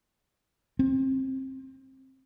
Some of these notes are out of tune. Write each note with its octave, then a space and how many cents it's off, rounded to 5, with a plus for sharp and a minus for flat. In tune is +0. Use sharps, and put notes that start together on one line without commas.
C4 +25